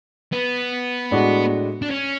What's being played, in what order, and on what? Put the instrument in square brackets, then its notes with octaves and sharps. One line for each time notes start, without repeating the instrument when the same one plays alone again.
[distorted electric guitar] B3
[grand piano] A2 G#3 D4 F#4
[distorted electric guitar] D4
C#4